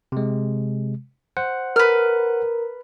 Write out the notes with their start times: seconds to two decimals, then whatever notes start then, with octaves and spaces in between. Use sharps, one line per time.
0.12 C3 G#3
1.37 C5 F#5
1.76 A#4 B4 F6